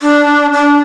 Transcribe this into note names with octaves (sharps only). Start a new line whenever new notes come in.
D4
D4